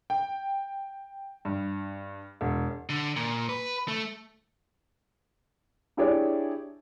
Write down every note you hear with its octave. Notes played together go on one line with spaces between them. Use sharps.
G5
G2
E1
D3
A#2
B4
A3
D4 E4 G4 G#4 C#5 D5